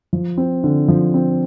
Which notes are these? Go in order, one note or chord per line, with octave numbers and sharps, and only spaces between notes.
F3
C4
D3
F3
C4